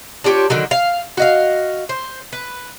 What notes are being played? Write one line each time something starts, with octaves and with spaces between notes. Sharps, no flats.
D4 F4 G4 C#5
D3 D#3 F#3
F5
F#4 D#5 F5
C5
B4